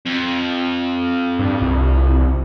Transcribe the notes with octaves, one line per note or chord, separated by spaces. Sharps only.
F2
G2
C2